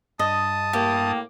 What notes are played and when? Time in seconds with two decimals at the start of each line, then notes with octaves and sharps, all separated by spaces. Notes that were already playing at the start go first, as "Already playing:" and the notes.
0.19 G2 D#5 A5 D#6
0.73 A2 A#3 G4